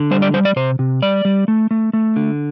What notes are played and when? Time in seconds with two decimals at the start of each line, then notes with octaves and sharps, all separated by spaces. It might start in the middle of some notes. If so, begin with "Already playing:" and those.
Already playing: D3
0.11 G3 C5
0.22 D5
0.34 G3 C5
0.45 D5
0.56 C3 C5
0.79 C3
1.02 G3 D5
1.25 G3
1.48 A3
1.71 A3
1.93 A3
2.16 D3